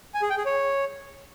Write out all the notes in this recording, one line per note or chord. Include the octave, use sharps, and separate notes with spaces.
G#5
G#4
G5
G#4
C#5